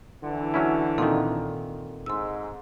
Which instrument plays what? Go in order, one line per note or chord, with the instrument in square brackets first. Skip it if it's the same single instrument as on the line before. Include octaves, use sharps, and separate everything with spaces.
[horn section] D3 E3
[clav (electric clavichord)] F#3 C#4 E4
[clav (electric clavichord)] A#2 D#3 [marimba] C4 D#4 A4
[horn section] G#2 [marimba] C6 E6